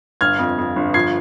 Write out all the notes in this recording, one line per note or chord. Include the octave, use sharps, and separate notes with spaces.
G1 F6 G#6
F2
F2
G1
F3 G#6 C7